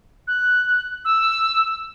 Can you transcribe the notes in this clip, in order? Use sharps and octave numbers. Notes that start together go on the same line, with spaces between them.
F#6
E6